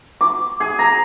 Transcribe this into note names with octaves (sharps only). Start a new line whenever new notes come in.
D6
G#4
A#5